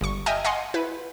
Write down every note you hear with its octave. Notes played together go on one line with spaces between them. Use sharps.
G1 C#6
D#5 E5 G5 G#5 F6
D#5 F5 F#5 G#5 C6
E4 B4